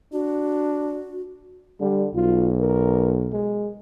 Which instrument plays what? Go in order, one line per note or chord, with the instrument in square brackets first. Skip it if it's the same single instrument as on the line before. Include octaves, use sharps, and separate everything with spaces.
[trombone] D4 [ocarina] F#4
[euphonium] D3 [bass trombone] G3
[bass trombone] B1 [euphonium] F4
[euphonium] A#4
G#3